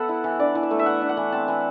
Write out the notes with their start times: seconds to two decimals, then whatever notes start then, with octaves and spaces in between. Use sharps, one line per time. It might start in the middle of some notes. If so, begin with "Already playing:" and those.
Already playing: B3 A4 E5 F#5
0.09 E4
0.24 E3
0.39 D4 D5
0.55 E3
0.63 E5
0.71 A3
0.79 E5
0.86 E3 F#5
1.01 D4
1.09 F#5
1.17 E3
1.32 C4 A5
1.48 E3